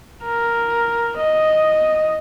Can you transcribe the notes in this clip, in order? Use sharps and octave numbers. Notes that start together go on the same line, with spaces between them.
A#4
D#5